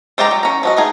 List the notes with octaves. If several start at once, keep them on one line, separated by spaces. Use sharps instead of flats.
G#3 C5 D5 G5 A#5
F#3
C#4 A#5
F3 F#4 D#5
A3 D#4 G#4